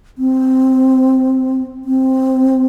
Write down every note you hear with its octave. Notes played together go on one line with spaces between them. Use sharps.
C4
C4